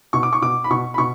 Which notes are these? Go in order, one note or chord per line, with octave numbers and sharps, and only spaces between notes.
B2 C#6
D6
C#6
B2 D6
B5
B2 C#6
B5
B2 C#6